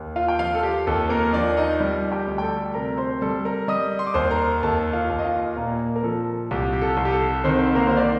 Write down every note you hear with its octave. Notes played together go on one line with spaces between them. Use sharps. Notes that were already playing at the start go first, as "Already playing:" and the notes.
Already playing: D#2
F4 F5
G5
F3 F4 F5
A4
G4
D#2 A4
A#3 A#4
F3 D4 D5
D#4 D#5
G3
G4 G5
D2
G5
A4 A5
C3 A#4 A#5
C5 C6
G3 A4 A5
A#4 A#5
G3 D#5 D#6
C6
D6
D#2 C5 C6
A#4 A#5
D#2 A4 A5
F4 F5
D#2
D#5
F4 F5
A#2 A#3 A#4
A#4
F3 A4
C2 G4
G4
A4
C2
G4
A4
D#3 C4 C5
A#3 A#4
D#3 C5
D5